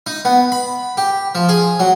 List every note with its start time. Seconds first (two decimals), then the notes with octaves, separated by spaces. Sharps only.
0.07 D#4
0.25 B3
0.52 B5
0.97 G4
1.35 F3
1.49 G#4
1.80 F#3